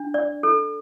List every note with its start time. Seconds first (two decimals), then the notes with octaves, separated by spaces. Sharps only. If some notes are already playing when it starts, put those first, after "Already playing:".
Already playing: D4
0.14 D5
0.43 A4